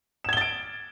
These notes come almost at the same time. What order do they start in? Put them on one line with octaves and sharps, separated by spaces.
E7 G#6 G7 A6 D7